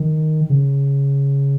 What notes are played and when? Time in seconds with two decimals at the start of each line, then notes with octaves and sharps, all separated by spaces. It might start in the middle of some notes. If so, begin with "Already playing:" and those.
Already playing: D#3
0.50 C#3